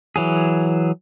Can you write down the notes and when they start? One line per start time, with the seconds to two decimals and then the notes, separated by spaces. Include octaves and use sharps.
0.16 E3 F#3 G#4